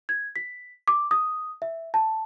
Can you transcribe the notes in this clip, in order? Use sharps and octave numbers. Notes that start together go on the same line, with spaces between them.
G#6
B6
D6
D#6
E5
A5